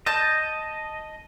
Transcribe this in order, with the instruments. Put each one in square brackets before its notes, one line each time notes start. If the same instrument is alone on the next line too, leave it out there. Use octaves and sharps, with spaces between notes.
[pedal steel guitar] D#5 [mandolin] A5 G6